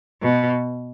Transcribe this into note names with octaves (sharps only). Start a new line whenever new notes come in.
B2